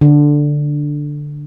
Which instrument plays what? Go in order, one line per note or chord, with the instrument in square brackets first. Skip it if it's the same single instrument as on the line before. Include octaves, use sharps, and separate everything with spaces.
[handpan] D3